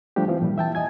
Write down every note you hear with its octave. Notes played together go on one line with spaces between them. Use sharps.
F3 G3 A3 D4 G4
E3 F3 C4
A#2 G3
E3 E5 G5 A5
D#5 G#5 G#6